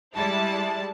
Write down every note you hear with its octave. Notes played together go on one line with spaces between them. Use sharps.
G3 G#3 E4 A5